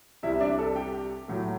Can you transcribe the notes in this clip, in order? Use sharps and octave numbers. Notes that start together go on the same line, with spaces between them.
C2 C3 G3 E4 E5
E5
D4 D5
A4 A5
G4 G5
A2 F#3 A3